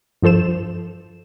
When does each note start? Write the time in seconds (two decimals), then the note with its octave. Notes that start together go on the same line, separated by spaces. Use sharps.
0.22 G2 F3 A4 C5 E7